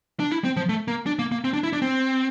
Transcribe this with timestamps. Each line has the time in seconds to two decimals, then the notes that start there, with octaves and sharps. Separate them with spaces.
0.20 D4
0.31 E4
0.44 C4
0.57 F3
0.69 A3
0.88 A#3
1.06 D4
1.19 A#3
1.32 A#3
1.44 C4
1.53 D4
1.63 E4
1.73 D4
1.82 C4